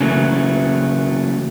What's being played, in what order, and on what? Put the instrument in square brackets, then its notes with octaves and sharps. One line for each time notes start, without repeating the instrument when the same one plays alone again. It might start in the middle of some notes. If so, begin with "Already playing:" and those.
[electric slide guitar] C#3 E3 F#3 A3 A#3